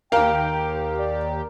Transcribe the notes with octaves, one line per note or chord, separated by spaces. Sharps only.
D#2 G4 A#4 F5 G5
D5